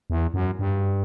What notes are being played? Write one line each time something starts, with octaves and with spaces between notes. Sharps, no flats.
E2
F#2
G2